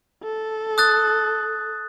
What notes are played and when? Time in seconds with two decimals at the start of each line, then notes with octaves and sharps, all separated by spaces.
0.23 A4
0.78 D#6 F#6 A6